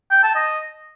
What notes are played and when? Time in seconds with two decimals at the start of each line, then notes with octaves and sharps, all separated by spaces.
0.11 G5
0.23 A5
0.35 D#5